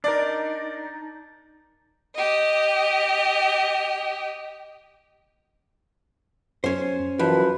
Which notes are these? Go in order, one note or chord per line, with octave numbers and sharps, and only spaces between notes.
D4 D#4 A#4 D5
G4 D#5
F#2 C#4 C5
F#2 E3 F3 B4